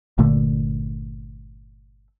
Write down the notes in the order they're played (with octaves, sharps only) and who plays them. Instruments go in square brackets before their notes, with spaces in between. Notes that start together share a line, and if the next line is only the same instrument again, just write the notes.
[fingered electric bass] G1 A#2 D3 A3